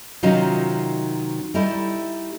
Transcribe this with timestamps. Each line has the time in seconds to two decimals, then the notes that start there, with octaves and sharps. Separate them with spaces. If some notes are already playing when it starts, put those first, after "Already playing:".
0.23 C3 D#3 F#3 C#4 D#4 F4
1.54 G3 A3 D#4 E4